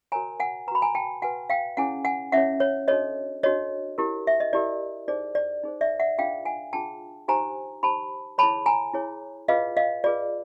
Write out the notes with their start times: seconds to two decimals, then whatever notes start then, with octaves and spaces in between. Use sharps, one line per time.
0.12 F#4 A#4 C#5 G#5 A#5
0.40 F#5 G#5
0.67 B4 A#5
0.72 F#4 B5
0.82 G#5 A#5
0.95 G5 A5
1.22 F#4 B4 F#5 G#5
1.50 F5 G5
1.77 C#4 E4 G#4 C#5 F#5 G#5
2.05 F#5 G#5
2.32 C#4 E4 G#4 C#5 E5 F#5
2.60 C#5
2.88 D4 F#4 A4 C#5 D#5
3.43 D4 F#4 A4 C#5 D#5
3.98 E4 G4 A#4
4.27 E5
4.40 D#5
4.53 E4 G4 A#4 D5
5.08 D#4 G#4 C5 D5
5.35 D5
5.64 D#4 G#4 C5
5.81 D5 E5
6.00 E5 F#5
6.18 D4 F4 G#4 F5 G5
6.45 F#5 G#5
6.73 D4 F4 G#4 G5 A5
7.28 D#4 G4 C5 G#5 A#5
7.83 D#4 G4 C5 A5 B5
8.38 E4 G#4 C#5 A5 B5
8.66 G#5 A#5
8.94 E4 G#4 C#5
9.48 F4 G#4 B4 D#5 F5
9.77 D#5 F5
10.04 F4 G#4 B4 D5